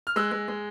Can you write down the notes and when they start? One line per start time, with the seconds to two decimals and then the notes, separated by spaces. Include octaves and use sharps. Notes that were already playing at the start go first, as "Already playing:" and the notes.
0.07 F6
0.16 G#3 E6 F#6
0.32 G#3
0.48 G#3